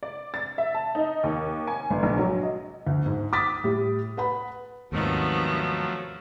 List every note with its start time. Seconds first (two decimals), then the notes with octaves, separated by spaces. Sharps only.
0.03 D5
0.34 A6
0.58 E5
0.75 A5
0.95 D#4
1.24 D#2
1.67 G#5
1.90 G1
2.03 A#1
2.17 F#3
2.43 D#5
2.87 D2
3.06 G#2
3.33 D6 D#6 A6 B6
3.64 A2 G3
4.17 B4 F#5 B5
4.92 D#2 G#2 C3 D#3 F3 F#3 A3 B3